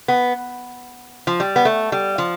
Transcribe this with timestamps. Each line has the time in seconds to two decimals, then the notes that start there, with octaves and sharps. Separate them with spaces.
0.08 B3
1.27 F3
1.40 G3
1.56 B3
1.65 A3
1.92 G3
2.18 F3